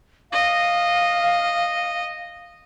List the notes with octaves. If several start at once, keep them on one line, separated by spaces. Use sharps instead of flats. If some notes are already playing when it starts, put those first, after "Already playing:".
D#5 F5